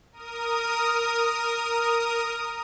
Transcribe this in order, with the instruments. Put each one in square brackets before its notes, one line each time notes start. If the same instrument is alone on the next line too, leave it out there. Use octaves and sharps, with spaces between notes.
[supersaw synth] A#4 D#6